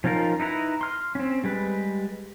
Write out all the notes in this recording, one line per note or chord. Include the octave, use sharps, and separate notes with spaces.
F3 C#4 D#4 F4 A#4
D#4 E4 B4 A#5
C6 F6
C4 C#4
G3 G#3 B4